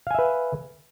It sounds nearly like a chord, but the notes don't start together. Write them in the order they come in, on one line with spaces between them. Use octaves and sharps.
F5 G#5 E5 B4